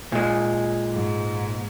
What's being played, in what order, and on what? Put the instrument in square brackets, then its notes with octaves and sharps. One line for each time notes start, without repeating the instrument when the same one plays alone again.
[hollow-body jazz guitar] A#2 G#3
[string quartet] G#2